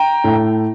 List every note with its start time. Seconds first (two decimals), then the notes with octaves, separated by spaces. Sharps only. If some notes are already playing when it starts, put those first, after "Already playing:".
Already playing: G5 A#5
0.24 A2